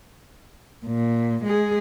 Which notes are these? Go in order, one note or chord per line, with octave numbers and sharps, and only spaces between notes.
A#2
G#3 G#4